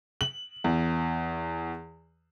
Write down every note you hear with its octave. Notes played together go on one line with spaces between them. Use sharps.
F#7
E2